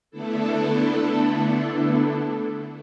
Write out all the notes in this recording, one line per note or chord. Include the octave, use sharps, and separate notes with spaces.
D3 A3 B3 D4 E4 A4